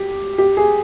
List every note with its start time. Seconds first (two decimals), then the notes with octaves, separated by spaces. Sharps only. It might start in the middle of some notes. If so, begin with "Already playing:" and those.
Already playing: G4
0.38 G4
0.57 G#4